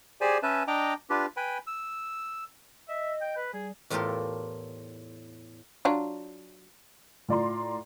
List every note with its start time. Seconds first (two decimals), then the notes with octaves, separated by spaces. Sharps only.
0.21 G4 G#4 C5 D5 G#5
0.43 C#4 B4 E5 G#5 A5
0.68 D4 D#5 G5 A#5 D6
1.10 D4 F4 G4 B4
1.37 B4 G5 G#5 B5
1.67 E6
2.89 D#5 E5
3.21 G5
3.36 B4
3.53 G3 G#4
3.90 E2 A2 F4 G4 A4 A#4
5.85 F#3 D4 F4
7.28 A2 F4 D5 A#5 C6